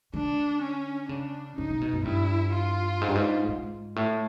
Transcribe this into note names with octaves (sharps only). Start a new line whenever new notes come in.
D3 D4
C#4
C#3 D4
C#3 D#4
C3
B2
F#2
G#2
G2 E4
F4
G#2
G2
G#2
G#2
A2